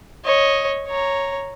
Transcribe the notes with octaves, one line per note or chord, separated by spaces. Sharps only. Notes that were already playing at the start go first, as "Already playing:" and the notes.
C#5 D#5
C#5 A#5